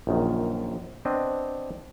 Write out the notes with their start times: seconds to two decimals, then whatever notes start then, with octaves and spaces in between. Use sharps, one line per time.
0.07 A#1 F#2 D#3
1.05 B3 C4 D4 C#5 D#5